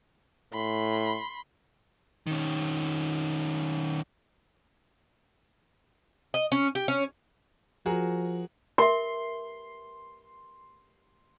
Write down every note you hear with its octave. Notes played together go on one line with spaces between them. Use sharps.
A2 B5 C6
D#3 C#4
D#5
C#4
G4
C#4
F3 F#4 G#4 A#4
A#4 E5 C6